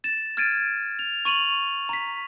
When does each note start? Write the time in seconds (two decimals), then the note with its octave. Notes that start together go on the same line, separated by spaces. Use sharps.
0.04 A6 E7
0.37 F6 G#6 A6 D7 D#7
0.99 F7
1.25 C#6 D#7 F7 F#7
1.89 A#5 B6